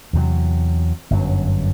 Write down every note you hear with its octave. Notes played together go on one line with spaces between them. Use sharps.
E2 C3 F#3
G1 F#2 F#3